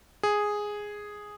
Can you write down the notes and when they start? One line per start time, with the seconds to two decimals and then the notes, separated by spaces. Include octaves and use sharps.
0.23 G#4